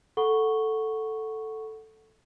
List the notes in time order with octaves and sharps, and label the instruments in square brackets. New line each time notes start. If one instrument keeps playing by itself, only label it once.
[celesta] A4 F#5 B5 C#6 G7